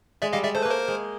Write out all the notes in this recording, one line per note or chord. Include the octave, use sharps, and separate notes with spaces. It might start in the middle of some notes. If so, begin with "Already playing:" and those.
G#3 D5 E5
G3 D#5 F5
G#3 D5 E5
A3 C5
A#3 B4
A#4 C5
G#3